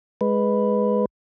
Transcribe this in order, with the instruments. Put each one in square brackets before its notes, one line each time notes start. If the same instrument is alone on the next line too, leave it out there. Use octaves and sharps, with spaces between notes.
[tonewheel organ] G#3 B4